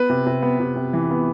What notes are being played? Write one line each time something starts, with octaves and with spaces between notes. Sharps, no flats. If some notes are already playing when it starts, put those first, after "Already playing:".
Already playing: B3 B4
C3
C3
B3
C3
C3
E3
B3